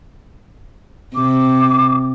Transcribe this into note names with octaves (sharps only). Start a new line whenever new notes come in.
C3 D6